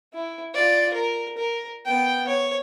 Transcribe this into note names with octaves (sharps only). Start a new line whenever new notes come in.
E4
F4 D5
A#4
A#4
B3 G5
C#5